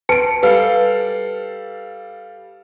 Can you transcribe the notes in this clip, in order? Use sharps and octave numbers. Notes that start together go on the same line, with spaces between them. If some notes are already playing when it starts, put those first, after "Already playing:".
B4 G#5 A5 C#7 D7
G3 A4 B4 F5